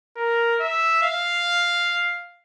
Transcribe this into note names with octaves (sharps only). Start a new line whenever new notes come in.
A#4
E5
F5